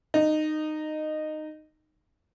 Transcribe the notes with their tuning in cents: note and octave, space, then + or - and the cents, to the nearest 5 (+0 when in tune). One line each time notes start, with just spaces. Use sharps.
D#4 -15